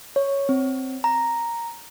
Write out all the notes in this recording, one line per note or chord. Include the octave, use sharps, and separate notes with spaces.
C#5
C4
A#5